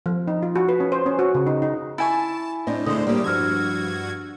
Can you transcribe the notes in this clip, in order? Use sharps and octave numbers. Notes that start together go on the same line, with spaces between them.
F3
D#4
F4
F#4
B4
C#4
C5
C#4
F#4
C#3
D#4
D#4
E4 G#5 A5 C#6
A2 C4 D4 D#5
D2 A2 D3 G#3 C5 D#6
A2 D3 G3 A#3 G4
G2 F3 D4 F#4 E6 F6 G#6